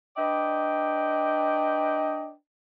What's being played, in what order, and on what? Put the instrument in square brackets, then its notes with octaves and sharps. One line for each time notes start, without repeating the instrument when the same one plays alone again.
[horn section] D4 B4 D5 D#5 G5